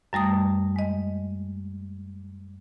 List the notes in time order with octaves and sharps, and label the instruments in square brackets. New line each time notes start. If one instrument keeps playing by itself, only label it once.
[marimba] F#2 G3 A3 D#6
G#3 D#5